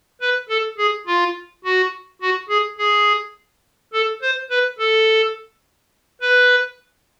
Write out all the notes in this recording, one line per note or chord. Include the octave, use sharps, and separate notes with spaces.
B4
A4
G#4
F4
F#4
F#4
G#4
G#4
A4
C5
B4
A4
B4